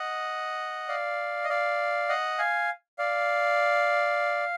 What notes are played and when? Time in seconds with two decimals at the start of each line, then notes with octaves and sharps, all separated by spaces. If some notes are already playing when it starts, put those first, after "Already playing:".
Already playing: D#5 F#5
0.89 D5 F5
1.44 D#5
1.49 D5 F5
2.09 D#5 F#5
2.38 F5 G#5
2.98 D5 F5